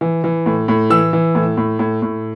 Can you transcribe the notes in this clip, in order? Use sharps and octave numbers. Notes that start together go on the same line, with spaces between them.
E3
E3
A2
A2
E3 E6
E3
A2
A2
A2
A2